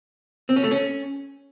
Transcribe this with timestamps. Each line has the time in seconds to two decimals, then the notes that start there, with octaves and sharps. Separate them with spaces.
0.49 C4
0.56 C#4
0.64 A3
0.71 C#4